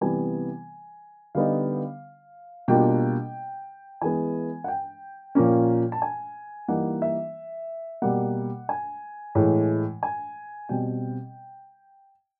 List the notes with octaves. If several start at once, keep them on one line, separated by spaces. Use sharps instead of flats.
C3 E3 G3 B3 G#5
D3 G3 B3 D#4 F5
B2 G3 A#3 D4 F4 G5
E3 G#3 B3 G#5
F#5
G5
A#2 F3 A#3 C#4
A5
G#5
E3 G3 A#3 D#4 F#5
E5
B2 G3 A#3 F#5
G#5
A2 E3 G#3
G#5
B2 G3 C4 G5